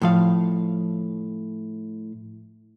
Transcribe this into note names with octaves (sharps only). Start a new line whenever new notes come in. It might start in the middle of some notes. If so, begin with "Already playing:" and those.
A2 F3 F5